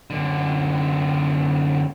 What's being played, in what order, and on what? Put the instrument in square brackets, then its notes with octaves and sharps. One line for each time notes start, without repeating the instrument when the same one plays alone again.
[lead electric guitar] F#2 D3